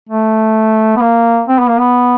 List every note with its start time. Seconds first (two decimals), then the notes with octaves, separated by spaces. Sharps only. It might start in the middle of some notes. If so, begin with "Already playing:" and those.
0.09 A3
0.97 B3
1.01 A#3
1.48 C4
1.59 B3
1.69 A#3
1.80 B3